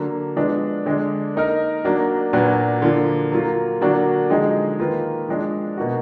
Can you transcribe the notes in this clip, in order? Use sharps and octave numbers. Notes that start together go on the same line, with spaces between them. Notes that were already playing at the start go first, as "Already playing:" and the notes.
Already playing: D3 F#3 A#3
F3 G#3 B3 D4
D3 G#3 D4
A#3 D#4 A#4
F#3 A#3 D4 F#4
A#2 F#3 D4 F#4 B4
D3 F3 A#3 F4
F#3 A#3 F4
D3 F#3 A#3 D4 F#4
D3 F3 G#3 D#4 G#4
D#3 A#3 F4 B4
F3 G#3 D4
B2 A#3 D#4 F#4